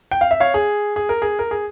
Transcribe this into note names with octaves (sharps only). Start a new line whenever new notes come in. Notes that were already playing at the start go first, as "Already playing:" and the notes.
G5
F5
E5
C#5 F5
G#4
G#4
A#4
G#4
A#4
G#4